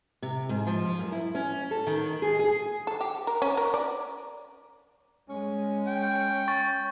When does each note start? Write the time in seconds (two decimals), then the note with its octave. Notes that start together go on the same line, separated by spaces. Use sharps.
0.22 C3
0.49 G#2
0.67 F3
0.99 F#2
1.12 E4
1.35 C#4
1.71 A4
1.87 D#3
2.22 G#4
2.39 G#4
2.87 A4
3.01 G4
3.27 A#4
3.42 C#4
3.57 A#4
3.74 D5
5.29 G#3 C#4
5.87 G5
6.48 C#6 A6